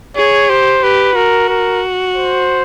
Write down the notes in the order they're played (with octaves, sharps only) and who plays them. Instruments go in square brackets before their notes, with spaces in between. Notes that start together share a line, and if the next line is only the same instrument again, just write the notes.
[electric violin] G#4 [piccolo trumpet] C#5
[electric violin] G4 [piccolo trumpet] C5
[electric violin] G4 [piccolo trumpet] B4
[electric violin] F#4 [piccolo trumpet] A#4
[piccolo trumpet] A#4
C5